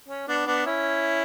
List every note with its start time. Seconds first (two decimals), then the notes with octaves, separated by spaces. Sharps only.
0.08 C#4
0.28 B3 D4
0.46 B3 D4
0.66 C#4 E4